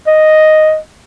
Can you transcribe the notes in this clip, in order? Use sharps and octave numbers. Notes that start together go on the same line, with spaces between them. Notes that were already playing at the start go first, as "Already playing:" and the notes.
D#5